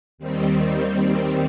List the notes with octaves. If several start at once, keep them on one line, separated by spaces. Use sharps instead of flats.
D#2 D#3 G3 C4